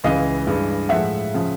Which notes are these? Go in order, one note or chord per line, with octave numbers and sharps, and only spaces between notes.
C#2 C#3 E3 D#5 F5
G2 E3 G#3
A2 F3 G#3 E5 F#5
C#3 F3